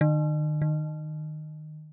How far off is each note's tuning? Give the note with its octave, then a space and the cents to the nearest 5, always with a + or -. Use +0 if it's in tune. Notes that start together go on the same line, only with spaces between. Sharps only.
D#3 -40
D#3 -20